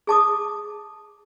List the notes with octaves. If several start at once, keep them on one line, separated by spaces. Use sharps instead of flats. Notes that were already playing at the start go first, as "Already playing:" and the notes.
G#4 A5 D6 D#6